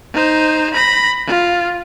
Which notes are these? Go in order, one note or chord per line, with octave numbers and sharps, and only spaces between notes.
D#4 C5
B5 A#6
F4